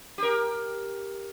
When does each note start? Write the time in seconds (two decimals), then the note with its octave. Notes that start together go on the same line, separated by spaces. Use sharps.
0.18 G4 A#4